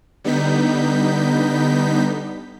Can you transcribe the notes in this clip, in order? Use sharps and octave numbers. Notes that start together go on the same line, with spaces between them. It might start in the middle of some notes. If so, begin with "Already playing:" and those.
D3 G3 B3 D#4 G6 B6